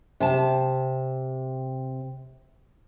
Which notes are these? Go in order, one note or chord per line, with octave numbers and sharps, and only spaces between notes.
C3 A5